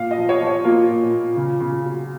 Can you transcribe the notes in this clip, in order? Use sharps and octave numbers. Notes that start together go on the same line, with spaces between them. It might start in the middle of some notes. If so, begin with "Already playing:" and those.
Already playing: A#2 F5
D#5
F3
C#5
F3
C#5
A#3 F4
A#2
A#2
C#3
C#3
F#3